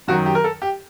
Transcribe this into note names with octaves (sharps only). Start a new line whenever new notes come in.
F#2 D#3 F#3 F#4
G4
A#4
A4
G4